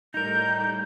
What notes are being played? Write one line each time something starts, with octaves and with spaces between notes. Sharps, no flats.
A2 G3 D#4 A#4 G6